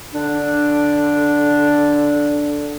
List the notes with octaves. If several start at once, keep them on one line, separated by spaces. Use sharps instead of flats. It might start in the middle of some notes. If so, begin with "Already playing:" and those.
D3 D4